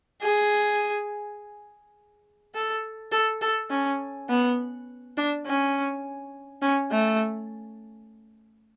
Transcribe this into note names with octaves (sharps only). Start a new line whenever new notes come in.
G#4
A4
A4
A4
C#4
B3
D4
C#4
C#4
A3